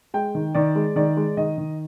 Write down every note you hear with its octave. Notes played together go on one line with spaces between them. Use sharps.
G#3 G5
D#3
D#3 D5
G#3
D#3 D5
G#3
D#3 D#5
D#3